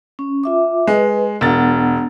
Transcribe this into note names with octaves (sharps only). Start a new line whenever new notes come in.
C#4
F4 E5 D6
G#3 B4 D#5
E1 B3 D4 F#5 A6